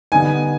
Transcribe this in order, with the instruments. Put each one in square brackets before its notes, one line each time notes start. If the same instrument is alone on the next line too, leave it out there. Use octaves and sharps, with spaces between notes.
[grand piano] D3 G3 B3 D#4 [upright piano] G#5